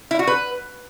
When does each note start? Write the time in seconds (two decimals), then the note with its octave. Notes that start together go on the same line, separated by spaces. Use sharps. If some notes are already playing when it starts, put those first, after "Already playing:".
0.11 E4
0.19 F#4
0.27 B4